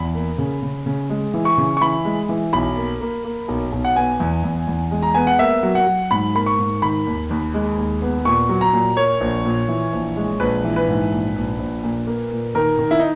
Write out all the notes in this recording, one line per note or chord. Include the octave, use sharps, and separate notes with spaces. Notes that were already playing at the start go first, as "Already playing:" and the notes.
Already playing: E2 B5
A#3
C#3
C#3
C#3
G#3
E3
C#6
C#3
C#6
E3 B5
G#3
E3
B1 B5
A#3
A#3
A#3
B1
B1
F#5
B3 G#5
E2
E2
E2
G#3
A#5
B3 G#5
F#5
A#3 E5
F#3
F#5
F#3
G#2 B5
A#3 B5
C#6
G#2
D#3 B5
D#2
D#2
G#3
D#2
B3
A#2 C#6
F#3
A#5
A#2
A#3 C#5
A#1
A#2
E3
A#1
G#3
A#1 B4
E3
B4
G#2
A#1
A#1
A#1
A#2
A#3
A#2
D#3 A#4
D#3
E4
D#4